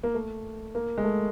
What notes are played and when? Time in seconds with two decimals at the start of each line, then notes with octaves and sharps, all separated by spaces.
0.03 A#3
0.14 A3
0.75 A#3
0.98 G#3
1.04 A3